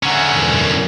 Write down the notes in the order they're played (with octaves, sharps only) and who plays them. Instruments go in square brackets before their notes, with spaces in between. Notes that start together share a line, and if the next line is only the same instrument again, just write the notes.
[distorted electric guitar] D3 C#4 [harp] E5 F#5 A#5
[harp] E1 B2
F#2